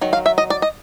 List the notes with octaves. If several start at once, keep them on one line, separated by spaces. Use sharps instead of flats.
D#3 F#3
F5
E5
D#5
D5
D#5